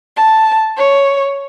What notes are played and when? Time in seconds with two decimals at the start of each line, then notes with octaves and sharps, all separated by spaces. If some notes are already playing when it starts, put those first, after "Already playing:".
0.17 A5
0.78 C#5